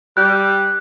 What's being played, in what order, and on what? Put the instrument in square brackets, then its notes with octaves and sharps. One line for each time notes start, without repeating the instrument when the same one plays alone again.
[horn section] G3 [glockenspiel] F#6